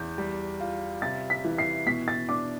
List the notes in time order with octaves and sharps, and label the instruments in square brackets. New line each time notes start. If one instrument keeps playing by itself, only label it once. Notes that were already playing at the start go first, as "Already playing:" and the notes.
Already playing: [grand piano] E2 [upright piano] G6
[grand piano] G3
F4
[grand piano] C3 [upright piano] A6
[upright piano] B6
[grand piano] E3
[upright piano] C7
[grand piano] B2 [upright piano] B6
[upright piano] A6
[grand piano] D4 [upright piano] D6